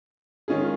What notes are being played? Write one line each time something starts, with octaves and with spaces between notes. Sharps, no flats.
D#3 G#3 C#4 F4 G#4